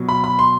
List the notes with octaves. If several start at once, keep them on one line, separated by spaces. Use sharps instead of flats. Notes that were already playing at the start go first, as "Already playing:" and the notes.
Already playing: B2 F#3
B5
B5
C6